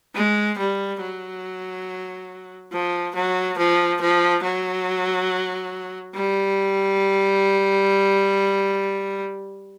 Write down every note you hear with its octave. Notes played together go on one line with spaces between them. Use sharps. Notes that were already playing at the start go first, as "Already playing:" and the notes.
G#3
G3
F#3
F3
F#3
F3
F3
F#3
G3